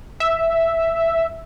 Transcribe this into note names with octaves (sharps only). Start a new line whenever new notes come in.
E5